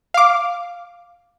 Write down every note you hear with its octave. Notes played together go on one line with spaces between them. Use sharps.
F5 D6